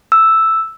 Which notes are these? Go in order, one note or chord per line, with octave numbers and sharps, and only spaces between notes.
E6